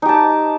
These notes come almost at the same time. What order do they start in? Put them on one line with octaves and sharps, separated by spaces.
D#4 G4 A5